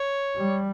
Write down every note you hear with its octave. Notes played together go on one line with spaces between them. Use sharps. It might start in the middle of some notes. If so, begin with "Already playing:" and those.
Already playing: C#5
G3